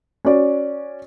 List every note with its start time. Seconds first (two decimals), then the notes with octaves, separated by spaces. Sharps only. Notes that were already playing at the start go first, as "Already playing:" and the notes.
0.25 C#4 F#4 D5